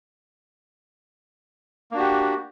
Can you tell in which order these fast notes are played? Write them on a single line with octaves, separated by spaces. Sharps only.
A#3 D4 F#4 G4